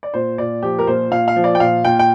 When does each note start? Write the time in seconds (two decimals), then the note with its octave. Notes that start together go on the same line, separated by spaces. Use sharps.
0.03 D5
0.14 A#2 C5
0.38 A#2 D5
0.62 F3 G4
0.79 A#4
0.87 A#2 C5
1.11 A#2 F5
1.28 F5
1.36 F3
1.44 D5
1.55 G5
1.60 A#2 F5
1.85 A#2 G5
1.99 G5